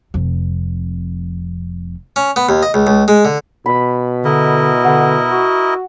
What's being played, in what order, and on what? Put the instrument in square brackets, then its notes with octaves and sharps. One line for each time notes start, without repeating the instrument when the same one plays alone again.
[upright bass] F1 F2
[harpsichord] C#4
B3
D#2
D#5
C#2
C#2
G#3
D3
[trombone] B2 [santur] B5
[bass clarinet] D3 [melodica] E4 A#4 D#5
[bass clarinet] D3 [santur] F#5
[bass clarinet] F#4